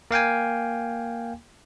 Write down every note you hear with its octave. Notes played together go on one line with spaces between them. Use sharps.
A#3 F5 G5 G#5